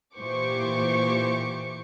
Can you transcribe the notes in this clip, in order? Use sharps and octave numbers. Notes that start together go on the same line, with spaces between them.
A#2 E3 G4 C5 C#6 D6